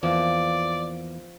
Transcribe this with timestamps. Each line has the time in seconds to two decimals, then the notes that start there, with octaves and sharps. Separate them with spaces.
0.03 E2 E3 F3 A#3 D5